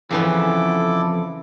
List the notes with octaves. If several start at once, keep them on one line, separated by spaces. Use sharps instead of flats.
F2 C#3 E3 B3 E4 A4 D6